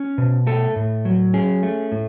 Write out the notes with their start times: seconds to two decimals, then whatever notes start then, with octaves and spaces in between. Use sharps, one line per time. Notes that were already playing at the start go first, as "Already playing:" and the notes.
Already playing: C#4
0.18 B2
0.47 A3 A4
0.76 A2
1.05 F#3
1.34 C#4 G#4
1.63 A3
1.92 A2